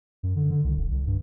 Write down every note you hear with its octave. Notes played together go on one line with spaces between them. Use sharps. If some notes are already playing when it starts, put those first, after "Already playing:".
F#2
D3
D3
C2
D#1
C2
G2